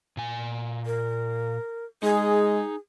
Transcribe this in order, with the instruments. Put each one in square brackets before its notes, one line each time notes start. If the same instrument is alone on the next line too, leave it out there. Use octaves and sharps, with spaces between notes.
[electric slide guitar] A#2 G#5
[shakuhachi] A#4
[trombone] G#3 [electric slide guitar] D#4 [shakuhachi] G#4